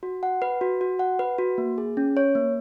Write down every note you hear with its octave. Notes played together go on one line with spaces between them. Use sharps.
F#4
F#5
B4
F#4
F#4
F#5
B4
F#4
A#3
G#4
C#4
C#5
A#3